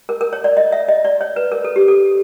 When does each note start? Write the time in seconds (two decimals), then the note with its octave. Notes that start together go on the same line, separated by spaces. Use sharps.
0.09 A#4
0.21 A#4
0.33 C#5
0.44 D5
0.57 D#5
0.72 E5
0.88 D#5
1.05 D5
1.21 C#5
1.36 B4
1.52 A#4
1.64 A4
1.76 G4
1.88 A4